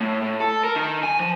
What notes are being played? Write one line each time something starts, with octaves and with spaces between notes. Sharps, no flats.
A2
A2
A4
A#4
D#3
G#5
F3